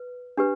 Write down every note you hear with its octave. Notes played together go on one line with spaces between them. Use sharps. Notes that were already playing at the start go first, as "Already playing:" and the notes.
Already playing: B4
D4 G4 B4